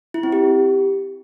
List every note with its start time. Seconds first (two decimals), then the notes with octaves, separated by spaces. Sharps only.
0.14 E4
0.23 C4
0.32 G4